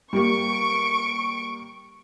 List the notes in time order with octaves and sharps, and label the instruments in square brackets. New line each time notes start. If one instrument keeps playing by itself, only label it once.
[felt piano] G3 A#3 G4 [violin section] C#6 D7